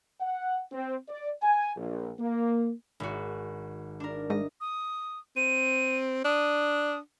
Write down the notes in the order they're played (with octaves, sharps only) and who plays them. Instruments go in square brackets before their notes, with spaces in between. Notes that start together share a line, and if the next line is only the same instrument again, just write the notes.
[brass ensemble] F#5
C4
D5
G#5
A#1
A#3
[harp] G#1 F#4
D4 A#4
[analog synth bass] G#2 [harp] D#5
[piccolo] D#6
[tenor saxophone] C4 [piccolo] D#7
[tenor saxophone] D4 [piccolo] D#6